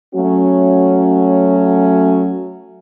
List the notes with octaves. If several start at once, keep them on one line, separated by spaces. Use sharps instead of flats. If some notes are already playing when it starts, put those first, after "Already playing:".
F#3 A3 C#4 F#4